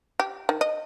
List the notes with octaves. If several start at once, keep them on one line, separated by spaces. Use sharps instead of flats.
G4
D#3
D#5